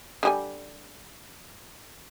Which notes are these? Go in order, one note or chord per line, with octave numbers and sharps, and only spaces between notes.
D3 G3 G#5